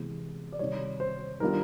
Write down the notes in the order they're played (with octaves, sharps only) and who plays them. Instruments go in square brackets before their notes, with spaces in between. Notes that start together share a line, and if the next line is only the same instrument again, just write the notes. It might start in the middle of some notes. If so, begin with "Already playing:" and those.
Already playing: [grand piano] C3 E3 G#3 B3
D5
C3 D#3 G3 C#5
C5
D#3 G3 B3 D4 F4 A#4